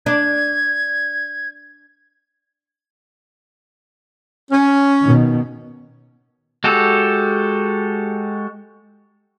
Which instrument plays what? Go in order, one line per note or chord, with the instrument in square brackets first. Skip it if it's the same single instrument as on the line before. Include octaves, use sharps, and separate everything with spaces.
[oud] D4 [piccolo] G#6
[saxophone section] C#4
[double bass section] B2 D#3
[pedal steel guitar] G#3 F#4 G4 A4